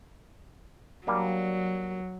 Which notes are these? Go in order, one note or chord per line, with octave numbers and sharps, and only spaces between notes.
F#3 G3 A#3 D4